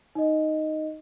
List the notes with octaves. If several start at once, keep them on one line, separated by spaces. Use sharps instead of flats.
D#4 D#5